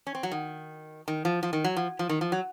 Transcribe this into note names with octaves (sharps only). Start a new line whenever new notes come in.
C#4
C4
F#3
D#3
D#3
F3
F3
D#3
F#3
F3
F3
D#3
F3
F#3